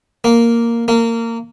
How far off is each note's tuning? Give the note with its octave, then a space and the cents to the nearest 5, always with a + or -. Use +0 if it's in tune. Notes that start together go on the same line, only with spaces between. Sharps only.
A#3 +0
A#3 -20